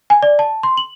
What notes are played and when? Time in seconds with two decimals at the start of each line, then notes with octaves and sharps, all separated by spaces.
0.10 G#5
0.23 D5
0.39 A5
0.63 C6
0.77 F#7